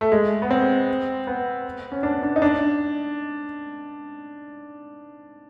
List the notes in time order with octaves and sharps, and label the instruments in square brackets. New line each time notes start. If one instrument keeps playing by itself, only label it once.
[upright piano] A3
G#3
B3
C4
B3
C#4
D4
D4
D#4
D4